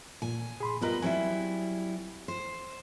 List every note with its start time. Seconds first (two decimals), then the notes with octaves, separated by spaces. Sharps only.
0.22 A#2 G#5
0.60 G#4 B5 C6
0.82 G3 B3 F4 A#4 B4 D#5
1.02 F#3 G3 C4 E4 G#5
2.28 C5